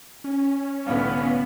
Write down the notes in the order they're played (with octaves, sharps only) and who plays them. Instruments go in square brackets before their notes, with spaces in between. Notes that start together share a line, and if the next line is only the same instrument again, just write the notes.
[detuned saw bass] C#4
[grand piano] C2 A2 D3 [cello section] B3 [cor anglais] F5